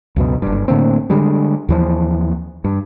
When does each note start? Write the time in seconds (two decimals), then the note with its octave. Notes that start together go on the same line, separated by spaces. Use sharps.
0.16 C#2 F#2 B2
0.42 F#1 G2
0.68 A2 D3 A#3 C4
1.10 D3 G3 G#3
1.69 D#2 E3 F3
2.64 G2